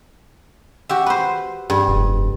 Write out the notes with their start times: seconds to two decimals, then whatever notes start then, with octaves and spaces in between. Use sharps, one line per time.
0.89 F#4 G4 E5
1.06 B4 C5
1.70 G2
1.88 F1